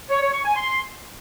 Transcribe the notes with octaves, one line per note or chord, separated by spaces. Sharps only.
C#5
C#5
C#6
G#5
C6